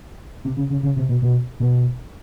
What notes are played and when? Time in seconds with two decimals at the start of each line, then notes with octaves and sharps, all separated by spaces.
0.44 C3
0.57 C#3
0.70 C#3
0.83 C#3
0.96 C3
1.09 B2
1.22 B2
1.60 B2